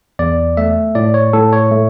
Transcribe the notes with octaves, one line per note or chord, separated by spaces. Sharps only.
E2 D5
A3 E5
A2 D5
C#5
A2 A4
C#5
A3